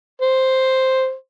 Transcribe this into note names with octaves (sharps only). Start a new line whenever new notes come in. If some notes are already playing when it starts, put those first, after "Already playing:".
C5